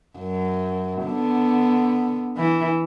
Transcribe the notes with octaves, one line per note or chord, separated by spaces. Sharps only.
F#2
D3 B3
E3